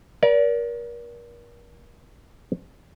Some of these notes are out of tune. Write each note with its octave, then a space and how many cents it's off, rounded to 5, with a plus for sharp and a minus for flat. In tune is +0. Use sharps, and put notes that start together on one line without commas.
A#4 +35 D5 -30